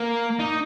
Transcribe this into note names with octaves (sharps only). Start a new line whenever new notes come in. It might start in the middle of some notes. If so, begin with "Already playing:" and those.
Already playing: A#3
D#4